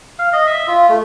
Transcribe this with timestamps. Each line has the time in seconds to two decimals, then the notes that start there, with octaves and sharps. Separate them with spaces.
0.19 F5
0.33 D#5
0.46 E5
0.68 F4
0.89 A3